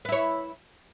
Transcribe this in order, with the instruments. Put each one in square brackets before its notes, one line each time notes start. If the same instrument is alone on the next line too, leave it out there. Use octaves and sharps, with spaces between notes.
[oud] B4
E4
C#5